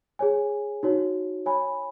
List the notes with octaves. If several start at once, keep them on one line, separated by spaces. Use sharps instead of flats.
G#4 C#5 G#5
D#4 F#4 C#5
C#5 G#5 B5